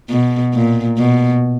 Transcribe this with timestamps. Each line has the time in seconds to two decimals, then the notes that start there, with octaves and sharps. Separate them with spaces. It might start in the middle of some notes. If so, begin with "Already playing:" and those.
0.10 B2
0.54 A#2
0.98 B2